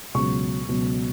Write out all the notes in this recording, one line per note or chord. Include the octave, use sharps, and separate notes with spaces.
C#2 B2 F#3 C#6
C#2 B2 F#3